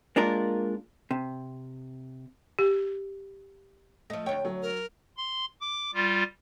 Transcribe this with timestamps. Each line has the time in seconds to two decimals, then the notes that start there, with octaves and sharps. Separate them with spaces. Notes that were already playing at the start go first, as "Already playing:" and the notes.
0.16 G#3 A#3 D4 F4 A#4
1.11 C3
2.59 G4
4.10 F3 A3 D#5
4.26 D2 C#5 G5
4.45 F#3
4.62 A#4
5.17 C6
5.61 D6
5.94 G3 F4